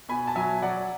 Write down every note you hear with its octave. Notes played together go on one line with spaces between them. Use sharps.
B2 G#5 B5
A5
F#3 E5 G#5
F#3 D5 F#5